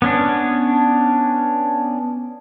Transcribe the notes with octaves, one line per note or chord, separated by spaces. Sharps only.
B3 C#4 D4